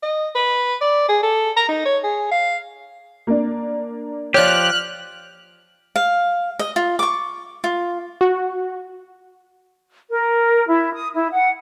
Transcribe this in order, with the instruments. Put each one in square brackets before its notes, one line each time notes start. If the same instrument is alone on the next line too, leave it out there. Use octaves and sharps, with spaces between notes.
[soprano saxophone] D#5
B4
D5
G#4
A4
A#5
D#4
C#5
G#4
F5
[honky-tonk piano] A#3 D4
[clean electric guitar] F3 G4 [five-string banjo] C#5 D5 [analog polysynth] F6 F#6
[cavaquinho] F5
D#5
F4
C#6 D6
F4
[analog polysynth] F#4
[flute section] A#4
E4
D#6
E4
F#5